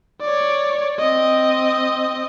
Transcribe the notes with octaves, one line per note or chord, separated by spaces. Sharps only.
C#5 D5
C4 D#5